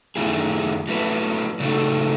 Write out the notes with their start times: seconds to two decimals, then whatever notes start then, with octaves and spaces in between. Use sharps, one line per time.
0.16 F#2 D#3 A3 E4 G#4
0.88 F#3 A3 E4 B4
1.60 C#3 F#3 A3 D#4 A4